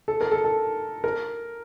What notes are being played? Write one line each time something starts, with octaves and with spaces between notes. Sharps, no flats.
A4
A#4
A4
A4
A#4